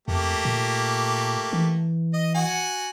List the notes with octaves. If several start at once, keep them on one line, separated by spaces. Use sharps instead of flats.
F2 A3 A#3 G4
A#2
E3
D#5
F#4 F#5 G#5